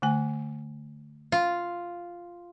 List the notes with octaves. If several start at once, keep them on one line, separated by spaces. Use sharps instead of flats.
D3 A3 G#5
F4